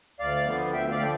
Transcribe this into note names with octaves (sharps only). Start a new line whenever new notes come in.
D2 D5 F5
D3 F3 B3
D2 E5 G5
D5 F5
D3 F3 G5